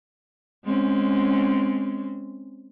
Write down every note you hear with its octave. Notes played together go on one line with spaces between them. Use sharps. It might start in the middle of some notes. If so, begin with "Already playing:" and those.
G#3 C4 C#4